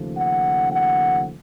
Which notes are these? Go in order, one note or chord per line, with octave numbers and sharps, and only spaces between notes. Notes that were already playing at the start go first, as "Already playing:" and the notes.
Already playing: D#2 C#3 F3 A3
F#5
F#5